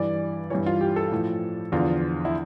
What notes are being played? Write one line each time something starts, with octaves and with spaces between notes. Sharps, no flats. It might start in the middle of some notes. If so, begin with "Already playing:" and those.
Already playing: G2 E3 D5
G2 E3 C#5
F4
G4
A4
A2 F3
E2 D3 F3 F4
E4